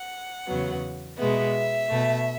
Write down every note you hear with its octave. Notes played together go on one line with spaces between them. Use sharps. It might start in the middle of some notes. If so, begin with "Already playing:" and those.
Already playing: F#5
E2 C#3 F#3 B3
B2 G#3 B3 E5
B2 A3